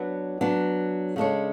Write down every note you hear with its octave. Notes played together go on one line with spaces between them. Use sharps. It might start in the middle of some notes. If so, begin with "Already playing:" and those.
Already playing: F#3 B3 D4
F#3 B3 D4
C#3 G#3 D4 A4 C#5